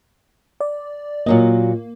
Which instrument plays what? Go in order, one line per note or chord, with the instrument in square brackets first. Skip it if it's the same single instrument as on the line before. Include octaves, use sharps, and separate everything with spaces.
[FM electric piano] D5
[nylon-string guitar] A#2 F#3 D#5 [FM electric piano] A#3